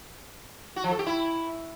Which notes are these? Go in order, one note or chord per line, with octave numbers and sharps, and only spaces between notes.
F#4
F3
A4
G4
E4